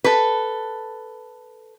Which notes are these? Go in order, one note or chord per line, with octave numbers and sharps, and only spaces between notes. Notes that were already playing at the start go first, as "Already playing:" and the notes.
A4 B4